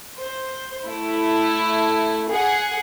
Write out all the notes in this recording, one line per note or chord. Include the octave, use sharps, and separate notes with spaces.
C5
A3 E4
G#4 F#5